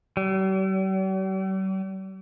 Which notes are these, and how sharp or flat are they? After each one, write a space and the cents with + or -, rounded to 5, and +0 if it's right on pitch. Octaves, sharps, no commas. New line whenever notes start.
G3 -45